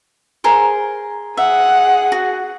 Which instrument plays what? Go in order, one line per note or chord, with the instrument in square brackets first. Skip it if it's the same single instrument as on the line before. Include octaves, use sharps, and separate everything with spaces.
[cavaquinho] G#4 A#4 C5
[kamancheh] G#4 F#5 [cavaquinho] E5
[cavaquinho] F#4